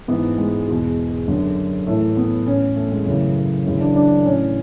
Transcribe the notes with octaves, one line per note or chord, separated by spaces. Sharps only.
G#2 E3 B3
G#3
E2 B2
F#2 D3
A2 E3 A3
B3
A2 E3 C#4
A3
G#3
F#2 C#3 E3 A3
F#2 C#3 E3 C#4
D4
D4
A2 E3 C#4